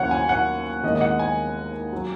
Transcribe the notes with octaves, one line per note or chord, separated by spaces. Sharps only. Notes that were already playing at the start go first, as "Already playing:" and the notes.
Already playing: D#2 C#3 F#3 C#5 F#5
G#5
F#5
D#2 D#3 G#3 D#5
D#5
F#5
G#5
F#3